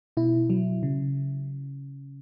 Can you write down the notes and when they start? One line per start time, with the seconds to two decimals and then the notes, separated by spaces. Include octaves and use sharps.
0.17 B2 E4
0.50 F#3
0.83 C#3